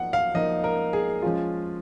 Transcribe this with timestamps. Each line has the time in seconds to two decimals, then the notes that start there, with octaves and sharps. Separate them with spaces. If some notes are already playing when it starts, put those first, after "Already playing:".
Already playing: F3 A#3 D#4 F#5
0.13 F5
0.34 F3 A#3 D#4 D#5
0.64 A#4
0.93 G#4
1.22 F3 G#3 C#4 F4